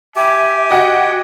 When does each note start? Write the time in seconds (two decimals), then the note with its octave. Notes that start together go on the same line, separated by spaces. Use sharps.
0.16 G4 E5 G#5
0.71 F#4 D#5 F#5 G5